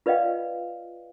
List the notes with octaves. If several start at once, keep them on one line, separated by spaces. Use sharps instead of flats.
F4 B4 D5 D#5 F5 G5